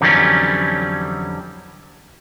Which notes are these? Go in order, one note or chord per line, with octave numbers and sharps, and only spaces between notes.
F2 D3 E3 F#3 G3 C#4